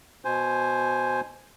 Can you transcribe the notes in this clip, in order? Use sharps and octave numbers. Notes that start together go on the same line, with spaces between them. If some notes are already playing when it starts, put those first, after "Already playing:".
B2 C5 G#5